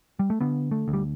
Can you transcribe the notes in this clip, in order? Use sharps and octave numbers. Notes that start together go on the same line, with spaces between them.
G3
A3
D3 B3
A3
D2
G3